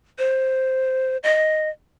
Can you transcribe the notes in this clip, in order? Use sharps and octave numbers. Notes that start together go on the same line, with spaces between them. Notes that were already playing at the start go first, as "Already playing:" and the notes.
C5
D#5